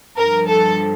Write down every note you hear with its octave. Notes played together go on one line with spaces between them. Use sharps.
G2 F3 A#4
A4